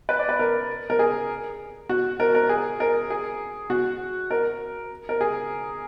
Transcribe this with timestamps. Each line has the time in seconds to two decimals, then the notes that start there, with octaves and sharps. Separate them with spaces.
0.09 B4
0.19 D5
0.29 B4
0.39 A#4
0.90 A#4
0.99 G#4
1.89 F#4
2.20 A#4
2.35 A#4
2.49 G#4
2.80 A#4
3.10 G#4
3.70 F#4
4.31 A#4
5.09 A#4
5.21 G#4